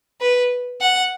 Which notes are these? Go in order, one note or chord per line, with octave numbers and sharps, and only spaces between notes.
B4
F#5